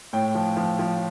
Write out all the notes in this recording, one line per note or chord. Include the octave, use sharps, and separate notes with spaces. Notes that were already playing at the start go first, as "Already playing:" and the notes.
A2 G5
F3
F3
F3